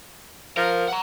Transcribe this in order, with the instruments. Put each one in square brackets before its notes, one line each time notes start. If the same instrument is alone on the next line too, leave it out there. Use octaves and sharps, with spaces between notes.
[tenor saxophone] F3 [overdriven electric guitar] A#4
[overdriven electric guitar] F#5 A#5